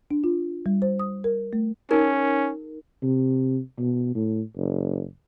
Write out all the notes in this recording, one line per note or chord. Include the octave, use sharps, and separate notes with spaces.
D4
F4
G3
C5
D#6
A#4
A3
C#4 D#4 G#4 A#4
C3
B2
A2
F#1